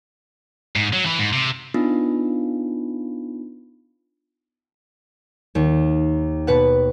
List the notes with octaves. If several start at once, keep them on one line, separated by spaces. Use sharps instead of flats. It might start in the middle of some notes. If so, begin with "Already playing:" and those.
G#2
F#3
E3
G#2
C3
B3 D4 D#4 F4
D#2
B2 B4 F#5